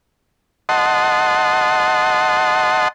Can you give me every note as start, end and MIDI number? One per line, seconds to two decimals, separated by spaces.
0.69 2.88 75
0.69 2.88 78
0.69 2.88 81
0.69 2.88 84